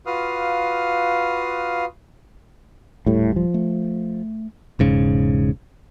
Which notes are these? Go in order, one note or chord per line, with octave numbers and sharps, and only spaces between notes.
F4 F#4 B4 F5 D#6 F6
D#1 A2 G3
F3
A3
E1 G#2 C#3